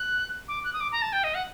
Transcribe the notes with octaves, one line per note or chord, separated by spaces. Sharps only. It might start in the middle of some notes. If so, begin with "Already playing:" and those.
Already playing: F#6
D6
F#6
D#6
D6
A#5
A5
G5
D#5
F#5